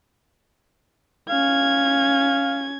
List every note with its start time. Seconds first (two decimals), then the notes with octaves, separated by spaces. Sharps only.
1.30 C#4 F5 G#6